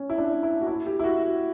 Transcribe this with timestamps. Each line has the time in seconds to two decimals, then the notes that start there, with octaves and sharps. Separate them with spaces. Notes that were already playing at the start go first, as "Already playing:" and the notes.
Already playing: C#4
0.10 E4
0.18 D4
0.43 E4
0.61 F#4
0.67 E4
0.87 G4
1.00 E4
1.04 F#4
1.23 F#4